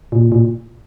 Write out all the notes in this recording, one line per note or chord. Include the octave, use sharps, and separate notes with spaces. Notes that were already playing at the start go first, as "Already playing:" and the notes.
A#2
A#2